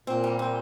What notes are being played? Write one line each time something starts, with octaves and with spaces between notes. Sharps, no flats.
A#2 C4
G3
C4